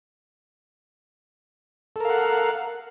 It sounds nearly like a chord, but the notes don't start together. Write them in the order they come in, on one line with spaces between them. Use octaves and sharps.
A4 A#4 F5 F#5